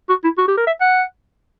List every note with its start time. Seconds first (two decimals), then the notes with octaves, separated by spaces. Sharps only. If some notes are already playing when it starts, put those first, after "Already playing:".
0.09 F#4
0.24 E4
0.38 F#4
0.48 G4
0.57 A#4
0.67 E5
0.81 F#5